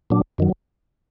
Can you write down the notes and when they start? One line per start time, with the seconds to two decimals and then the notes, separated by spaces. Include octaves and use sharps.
0.10 A#2 F#3 D4
0.38 F#2 D#3 F#3